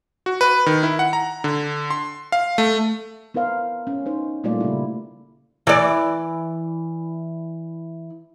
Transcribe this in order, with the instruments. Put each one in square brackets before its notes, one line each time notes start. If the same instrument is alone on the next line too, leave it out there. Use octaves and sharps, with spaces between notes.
[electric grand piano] F#4
B4
D#3
E4
F#5
A#5
D3
C6
F5
A3
[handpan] B3 E4 A#4 C5 F5
C#4
D#4 C5
A#2 G3 A3 A#3 F4 D5
C#3 E4
[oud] E3 D5